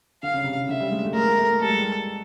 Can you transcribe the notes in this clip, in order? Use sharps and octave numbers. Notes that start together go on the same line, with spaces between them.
D3 F5
C#3
C3
C#3
D3 E5
G3
G#3
A3
G#3 A#4
A#3
A3
A#3
G3 A4
G#3
G3